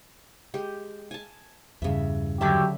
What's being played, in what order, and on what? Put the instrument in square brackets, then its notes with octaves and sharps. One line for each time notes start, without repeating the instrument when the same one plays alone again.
[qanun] G#3 G4
G#5 A5
[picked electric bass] E2 G2 [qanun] C#3 E5
[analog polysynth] D3 F#3 [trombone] G4 [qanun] E5 A5 B5